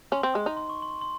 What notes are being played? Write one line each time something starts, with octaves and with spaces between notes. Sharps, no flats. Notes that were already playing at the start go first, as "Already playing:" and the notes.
C#4 C6
C4
G#3
D#4
C6
C#6
C6
C6